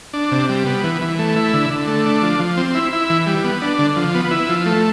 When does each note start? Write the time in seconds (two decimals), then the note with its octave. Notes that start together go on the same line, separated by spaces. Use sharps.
0.13 D4
0.31 C3
0.49 G3
0.66 B3
0.84 E3
1.01 E3
1.19 A3
1.36 E4
1.54 D3
1.70 D3
1.88 A3
2.06 D4
2.23 F3
2.40 F3
2.57 C4
2.75 E4
2.93 E4
3.10 E3
3.26 G3
3.44 B3
3.62 D4
3.79 D3
3.96 F3
4.14 B3
4.31 E4
4.49 F3
4.66 A3